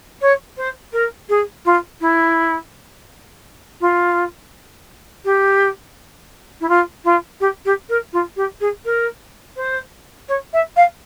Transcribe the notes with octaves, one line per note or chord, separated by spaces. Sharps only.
C#5
C5
A#4
G#4
F4
E4
F4
G4
E4
F4
F4
G4
G4
A#4
F4
G4
G#4
A#4
C5
C#5
E5
F5